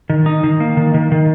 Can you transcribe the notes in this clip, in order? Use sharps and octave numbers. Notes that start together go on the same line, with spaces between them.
D#3
D#4
D#3
A#3
D#3
D#3
D#3